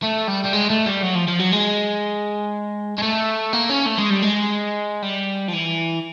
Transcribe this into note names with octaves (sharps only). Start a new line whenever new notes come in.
A3
G3
G3
G#3
A3
G3
F#3
F3
F3
F#3
G#3
G#3
A3
A#3
C#4
A3
G#3
G3
G#3
G3
F3
E3